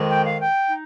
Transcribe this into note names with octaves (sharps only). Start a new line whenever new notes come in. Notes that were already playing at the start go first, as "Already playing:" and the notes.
Already playing: F2 D#3 G#3
G5
F5
G5
D#4